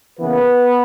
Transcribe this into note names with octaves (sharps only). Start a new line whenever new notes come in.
C#3 E3 A#3 B3 B4